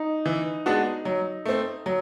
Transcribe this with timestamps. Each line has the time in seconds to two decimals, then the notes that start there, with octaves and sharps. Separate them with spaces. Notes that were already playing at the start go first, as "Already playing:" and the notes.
Already playing: D#4
0.26 E3
0.66 G#3 B3 D4 F#4
1.05 F#3
1.45 A3 C4
1.86 F#3